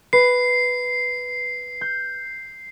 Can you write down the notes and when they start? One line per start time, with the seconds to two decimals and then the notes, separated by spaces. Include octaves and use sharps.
0.13 B4 C7
1.81 G6